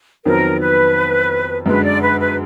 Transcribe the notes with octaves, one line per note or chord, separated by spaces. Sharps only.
F2 D#3 F#3 B3 A#4
B4
F#2 D3 G#3 B4
D5
B4
B4